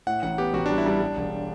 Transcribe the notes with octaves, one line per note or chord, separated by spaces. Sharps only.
A2 F#5
A1 F#5
B3 G4
A1 F#4
G3 D4
E4
G3 D4
G3
E1